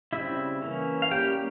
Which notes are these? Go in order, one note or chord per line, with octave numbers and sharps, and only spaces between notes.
C#3 G3 C4 E4 E5
E3 A#3 C#4
F5
G3 A#3 C#4 G4 G5